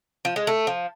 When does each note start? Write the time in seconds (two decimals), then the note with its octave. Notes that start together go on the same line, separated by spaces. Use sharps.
0.25 F3
0.36 G#3
0.47 A3
0.67 F3